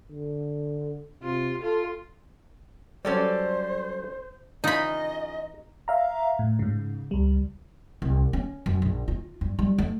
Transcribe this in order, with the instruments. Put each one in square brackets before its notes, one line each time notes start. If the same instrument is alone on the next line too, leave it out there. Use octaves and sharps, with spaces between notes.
[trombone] D3
[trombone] C3 [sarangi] F4
[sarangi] F4 [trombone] A4
[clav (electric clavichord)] F#3 G3 [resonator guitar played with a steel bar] C#4 A4 D5 [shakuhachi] C5
[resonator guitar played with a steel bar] C#3 F4 F5 [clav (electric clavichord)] E3 [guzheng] D#4 B5 [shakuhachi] D#5
[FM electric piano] E5 F5 A#5
A2
G#2 C#3
C#2 G3
[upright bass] C2
C#4
F#2
A#1
F4
G2
G3
A3